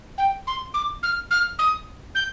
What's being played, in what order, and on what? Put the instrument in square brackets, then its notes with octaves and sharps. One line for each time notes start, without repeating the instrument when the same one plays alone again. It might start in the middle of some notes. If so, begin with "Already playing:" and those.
[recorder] G5
C6
D6
F6
F6
D#6
G6